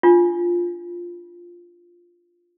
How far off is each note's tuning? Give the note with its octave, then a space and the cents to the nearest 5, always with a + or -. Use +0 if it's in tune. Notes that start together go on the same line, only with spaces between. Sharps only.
D4 +0 F4 -5